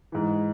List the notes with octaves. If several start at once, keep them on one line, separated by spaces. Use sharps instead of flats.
G#2 E3